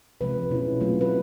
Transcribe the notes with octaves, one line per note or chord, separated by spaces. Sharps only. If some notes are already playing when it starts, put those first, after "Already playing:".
C3 F3 G#3 B4
B2 G#3 C#4 E4
A#2 F#3 A3 C4 F4
B4